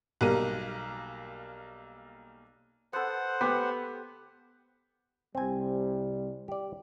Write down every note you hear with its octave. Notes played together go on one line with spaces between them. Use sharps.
B1 G3 A#3 A#4 D#7
B3 A4 C5 F#5
B3 G4
C2 C3 G3 C4 G#5
G4 D5